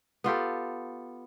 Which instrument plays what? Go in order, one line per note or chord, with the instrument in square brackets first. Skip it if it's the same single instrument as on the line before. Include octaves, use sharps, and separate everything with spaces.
[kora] B3 F4 G4 A4